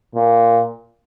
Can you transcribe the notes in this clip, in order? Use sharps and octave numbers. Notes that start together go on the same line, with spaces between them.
A#2